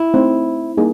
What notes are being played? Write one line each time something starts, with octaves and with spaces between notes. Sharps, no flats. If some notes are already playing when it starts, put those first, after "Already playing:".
Already playing: E4
A3 C4 D#4
G3 A#3 D#4 G#4